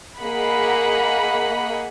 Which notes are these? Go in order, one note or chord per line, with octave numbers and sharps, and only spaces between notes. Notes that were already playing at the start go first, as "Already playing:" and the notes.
A#3 G#4 D#5 F#5 B5